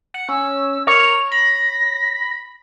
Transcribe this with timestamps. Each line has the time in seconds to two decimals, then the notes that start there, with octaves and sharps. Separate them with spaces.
0.14 F#5
0.29 C#4 E6
0.87 A#4 C#5 F7
1.32 B5 A#6